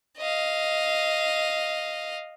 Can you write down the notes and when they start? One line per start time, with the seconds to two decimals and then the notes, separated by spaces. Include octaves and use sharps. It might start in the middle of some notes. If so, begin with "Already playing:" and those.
0.18 D#5 F5